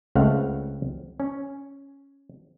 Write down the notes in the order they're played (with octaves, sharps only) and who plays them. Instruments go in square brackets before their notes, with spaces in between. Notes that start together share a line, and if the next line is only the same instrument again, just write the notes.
[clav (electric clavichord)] C#2 C#3 A3 C4 F5 F#5
C#4